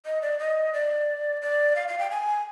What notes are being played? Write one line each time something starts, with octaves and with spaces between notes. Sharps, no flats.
D#5
D5
D#5
D5
D5
F5
F5
G5
G#5